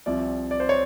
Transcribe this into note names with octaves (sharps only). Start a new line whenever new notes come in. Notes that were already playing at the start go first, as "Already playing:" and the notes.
C2 C3 F3 D5
D5
C5
C#5